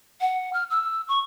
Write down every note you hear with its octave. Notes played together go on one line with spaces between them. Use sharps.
F#5
F6
E6
C#6